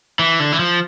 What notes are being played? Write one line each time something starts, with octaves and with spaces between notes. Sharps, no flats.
E3
D3
E3
F3